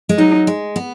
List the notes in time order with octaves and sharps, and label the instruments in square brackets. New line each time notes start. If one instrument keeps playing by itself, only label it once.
[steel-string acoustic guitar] G#3
[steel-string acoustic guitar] F#3 [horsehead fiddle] D#4
[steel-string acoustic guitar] G#3
B3